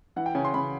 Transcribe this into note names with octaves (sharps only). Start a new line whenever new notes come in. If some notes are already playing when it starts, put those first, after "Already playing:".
E3 F#5
G5
C#3 G#5
C6
C#3 B5